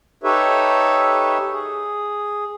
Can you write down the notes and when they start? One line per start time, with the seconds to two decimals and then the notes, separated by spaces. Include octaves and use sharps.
0.24 D#4 G4 A4 B4 C#5 E5
1.53 G#4